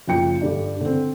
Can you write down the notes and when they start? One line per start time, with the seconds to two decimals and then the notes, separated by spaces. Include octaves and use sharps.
0.07 F#1 F3 G5 C#7
0.41 G2 D3 G4
0.81 D3 C4